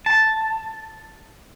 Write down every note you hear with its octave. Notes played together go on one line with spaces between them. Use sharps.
A5